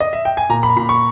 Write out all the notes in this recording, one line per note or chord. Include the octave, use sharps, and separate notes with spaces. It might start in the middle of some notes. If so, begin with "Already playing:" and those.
D#5
E5
G5
G#5
A#2 A#5
B5
A#2 B5
C#6